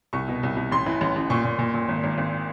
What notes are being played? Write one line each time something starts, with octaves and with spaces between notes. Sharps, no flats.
C2 C#6
B2
C2
C2
A1 C6
E3
A1
A1
A#2 C#6
A#2
A#2
A#2
G#1
G#1
G#1